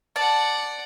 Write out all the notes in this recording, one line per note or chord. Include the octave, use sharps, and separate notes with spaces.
D5 F#5 A5